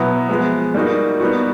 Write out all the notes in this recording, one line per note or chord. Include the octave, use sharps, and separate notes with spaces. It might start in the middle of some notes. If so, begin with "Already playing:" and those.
Already playing: B2 F#3 B3 E4
F3 G#3 B3
G3 A#3 D#4 F#4
G3 B3 D#4 F#4